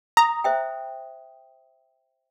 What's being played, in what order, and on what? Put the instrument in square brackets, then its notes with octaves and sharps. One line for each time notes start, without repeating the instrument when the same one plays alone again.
[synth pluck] A#5 [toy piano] D#6
[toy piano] C5 E5 G5